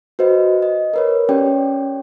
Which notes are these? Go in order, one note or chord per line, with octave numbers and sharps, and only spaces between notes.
F#4 B4 C5 D#5
D#5
A#4 B4 C#5
C#4 G4 C#5 D5 G5